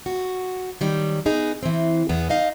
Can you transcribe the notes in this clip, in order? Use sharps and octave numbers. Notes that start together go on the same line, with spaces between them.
F#4
D#3 F#3 G3
B3 D#4 G#4
E3 C4
E2 B3 G#4
D#4 D#5 F5